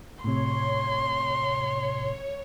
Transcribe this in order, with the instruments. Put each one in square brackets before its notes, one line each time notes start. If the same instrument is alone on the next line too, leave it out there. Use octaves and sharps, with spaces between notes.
[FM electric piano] A2 C3 [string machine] C#5 [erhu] C6